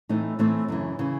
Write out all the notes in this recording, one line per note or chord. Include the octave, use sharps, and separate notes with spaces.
A2 E3 A3 C4 D#4
A2 E3 A3 C4 D#4
F#2 C#3 E3
C#3 E3